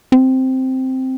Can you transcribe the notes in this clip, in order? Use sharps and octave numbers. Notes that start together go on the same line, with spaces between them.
C4